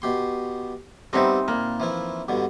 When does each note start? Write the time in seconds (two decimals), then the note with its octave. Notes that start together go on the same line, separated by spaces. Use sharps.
0.02 B2 G4 C6
1.13 G3 B3 C4 D#4 E4 C5
1.48 A#2 A#3
1.80 E3 F3 E4
2.28 G2 B2 D3